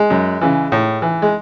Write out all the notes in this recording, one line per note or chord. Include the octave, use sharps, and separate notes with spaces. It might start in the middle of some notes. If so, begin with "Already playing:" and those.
Already playing: G#3
F#2
C#3 E3
A2
E3
G#3